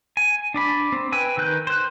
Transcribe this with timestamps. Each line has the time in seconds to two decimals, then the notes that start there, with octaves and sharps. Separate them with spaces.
0.17 G#5
0.54 D4 D5 B5
0.92 C4
1.12 B4 G5 G#5 E6
1.37 D#3 B4 F#6 G6
1.67 C5 F#6